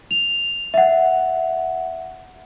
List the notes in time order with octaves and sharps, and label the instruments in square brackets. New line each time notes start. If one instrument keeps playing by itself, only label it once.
[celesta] F7
E5 F#5